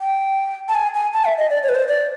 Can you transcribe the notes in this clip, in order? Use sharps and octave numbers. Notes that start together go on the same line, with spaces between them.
G5
A5
G#5
G#5
A5
E5
D#5
D5
C#5
B4
C5
D5